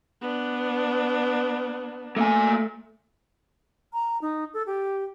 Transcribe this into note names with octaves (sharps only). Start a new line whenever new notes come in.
B3 D4
A3 A#3 G#5
A#5
D#4
A4
G4